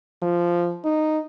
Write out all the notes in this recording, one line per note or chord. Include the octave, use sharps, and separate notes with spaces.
F3
D#4